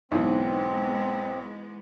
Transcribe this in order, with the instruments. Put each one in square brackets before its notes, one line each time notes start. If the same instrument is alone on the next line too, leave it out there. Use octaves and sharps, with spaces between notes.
[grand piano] B1 [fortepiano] G#2 E3 [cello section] G#3 B3 [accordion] C4